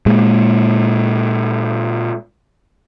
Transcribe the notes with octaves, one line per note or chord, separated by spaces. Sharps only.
A#2 G#3